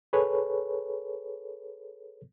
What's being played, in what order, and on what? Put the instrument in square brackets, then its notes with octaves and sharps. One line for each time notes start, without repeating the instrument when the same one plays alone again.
[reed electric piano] G#4 A4 B4 C#5